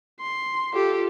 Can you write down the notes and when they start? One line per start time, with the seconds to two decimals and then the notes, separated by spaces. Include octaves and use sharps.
0.21 C6
0.74 F4 G4 A4